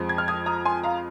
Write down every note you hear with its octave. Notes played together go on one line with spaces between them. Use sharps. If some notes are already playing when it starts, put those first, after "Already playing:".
Already playing: F2 F3 G#3
G#6
F6
D#6 G#6
A#5 D#6
G#5 C6
F5 A#5